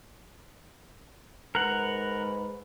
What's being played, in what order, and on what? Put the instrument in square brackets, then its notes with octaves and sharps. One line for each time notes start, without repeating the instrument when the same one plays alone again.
[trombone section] G#2 B4 [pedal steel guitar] A#4 F#5